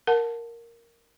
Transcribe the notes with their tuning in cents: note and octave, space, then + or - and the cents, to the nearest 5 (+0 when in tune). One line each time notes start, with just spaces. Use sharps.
A#4 +0 F#5 -25 A5 +0